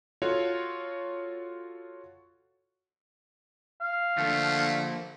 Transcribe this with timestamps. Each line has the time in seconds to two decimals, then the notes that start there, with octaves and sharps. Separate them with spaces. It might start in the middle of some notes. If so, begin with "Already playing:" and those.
0.22 F4 F#4 A4 C#5
3.81 F5
4.17 D3 F3 A3 A#3